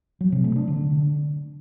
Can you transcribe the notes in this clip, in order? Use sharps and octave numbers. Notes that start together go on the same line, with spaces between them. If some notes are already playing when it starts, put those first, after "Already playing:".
F#3
C3
A3
D4
D3